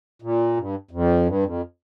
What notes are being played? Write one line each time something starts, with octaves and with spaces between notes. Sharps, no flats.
A#2
G2
F2
G2
F2